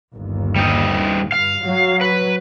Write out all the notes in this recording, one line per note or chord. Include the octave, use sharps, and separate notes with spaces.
G1 D#2
G3 D#4
G2 F5
F#3
B4